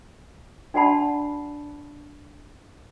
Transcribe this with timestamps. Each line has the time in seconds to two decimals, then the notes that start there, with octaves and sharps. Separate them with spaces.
0.74 D4 F#4 D5 F#5 A5 B5